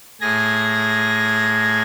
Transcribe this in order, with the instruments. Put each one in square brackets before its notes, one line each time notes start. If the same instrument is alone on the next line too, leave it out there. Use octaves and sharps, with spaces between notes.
[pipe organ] A2 G#4 G#5 A#6